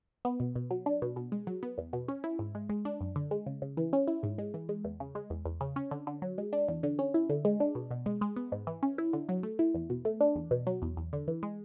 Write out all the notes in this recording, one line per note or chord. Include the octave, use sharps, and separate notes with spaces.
B3
B2
B2
F#3
D4
B2
B2
G#3
F#3
B3
E2
B2
C#4
E4
G#2
G#3
G#3
D4
F#2
D3
G#3
C#3
C#3
E3
C#4
E4
G#2
G#3
E3
G#3
E2
C#3
G#3
E2
E2
C#3
C#4
D3
D3
F#3
G#3
D4
E2
D3
C#4
E4
D3
G#3
D4
B2
B2
G#3
G#3
B3
G#2
E3
C#4
E4
D3
F#3
A3
E4
E2
B2
A3
D4
E2
B2
F#3
E2
E2
D3
E3
G#3